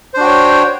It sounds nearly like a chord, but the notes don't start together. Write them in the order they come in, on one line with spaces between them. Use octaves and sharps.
C5 D4 F#4 G5 C#5